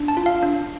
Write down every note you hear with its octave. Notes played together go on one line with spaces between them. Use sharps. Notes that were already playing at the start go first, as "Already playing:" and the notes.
Already playing: D4
A5
F4
F5
D4